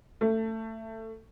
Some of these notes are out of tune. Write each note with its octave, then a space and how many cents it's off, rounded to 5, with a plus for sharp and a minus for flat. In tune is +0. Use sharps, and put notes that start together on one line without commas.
A3 +20